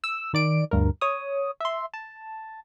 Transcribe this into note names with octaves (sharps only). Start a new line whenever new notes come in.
E6
D#3 D5 D7
D2 G2 A#4
C#5 D#6
E5 C6
A5